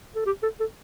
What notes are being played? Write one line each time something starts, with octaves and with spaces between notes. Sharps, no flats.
A4
G4
A4
A4